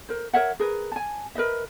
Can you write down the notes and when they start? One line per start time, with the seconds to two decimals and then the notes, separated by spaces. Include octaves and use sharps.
0.09 A#4 C5
0.33 A#4 C#5 E5 F#5
0.60 G#4 A#4 B4
0.92 G#5 A5
1.35 A#4 B4 D#5 E5